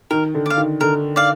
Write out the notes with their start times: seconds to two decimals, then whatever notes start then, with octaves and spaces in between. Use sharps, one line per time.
0.11 D#3 A#4
0.35 D3
0.46 D5 F5
0.58 D#3
0.81 D3 A#4
1.16 D5 F5